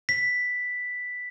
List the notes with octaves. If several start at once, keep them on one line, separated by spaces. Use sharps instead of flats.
B6